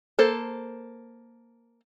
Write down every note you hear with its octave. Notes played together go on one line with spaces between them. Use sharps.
A#3 A4 C5